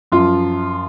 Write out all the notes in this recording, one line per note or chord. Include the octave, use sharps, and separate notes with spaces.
F#2 F3 F4